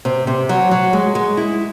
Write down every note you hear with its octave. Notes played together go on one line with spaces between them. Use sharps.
C3
C3
F#3
F#3
G#3
G#3
E4